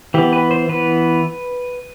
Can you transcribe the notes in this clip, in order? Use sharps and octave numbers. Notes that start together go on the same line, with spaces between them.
E3 B3 G4
B4
C5
E3 B3 B4